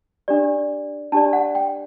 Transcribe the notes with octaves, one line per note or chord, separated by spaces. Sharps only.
D4 G4 D5
D4 G4 D5 A5
F#5
G5